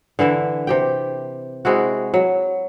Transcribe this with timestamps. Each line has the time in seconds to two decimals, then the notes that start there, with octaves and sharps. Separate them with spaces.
0.19 D3 E3 E4 E5
0.67 C3 G4 G5
1.65 C3 G#3 E4 F#4
2.14 F#3